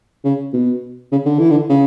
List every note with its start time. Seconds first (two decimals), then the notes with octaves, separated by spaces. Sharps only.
0.24 C#3
0.53 B2
1.12 C#3
1.26 D3
1.39 E3
1.51 D3
1.69 C#3